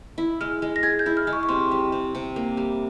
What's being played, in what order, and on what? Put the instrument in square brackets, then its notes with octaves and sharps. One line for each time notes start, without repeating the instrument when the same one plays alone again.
[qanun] E4
[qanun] G#3 [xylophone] F6
[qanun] G#3
[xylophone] A#6
[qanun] G#4 [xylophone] G#6
[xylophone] G6
[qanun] E4
[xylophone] F6
[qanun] G#3
[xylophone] C#6
C#6
[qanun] C3 [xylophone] C6
[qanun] G3
C3
C3
A#3
G3